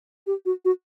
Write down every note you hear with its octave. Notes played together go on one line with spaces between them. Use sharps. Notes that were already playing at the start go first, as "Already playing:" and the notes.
G4
F#4
F#4